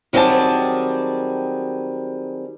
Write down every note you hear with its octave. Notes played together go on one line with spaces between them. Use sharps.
D#3 F#3 G3 C4 G#4 A5